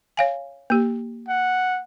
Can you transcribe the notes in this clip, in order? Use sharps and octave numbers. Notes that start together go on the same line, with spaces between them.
C#5 F5 G#5
A#3 G4
F#5